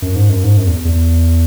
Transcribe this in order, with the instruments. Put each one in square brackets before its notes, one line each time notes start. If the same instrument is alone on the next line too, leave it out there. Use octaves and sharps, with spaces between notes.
[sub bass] F#2
G#2
F#2
G#2
F#2
E2
E2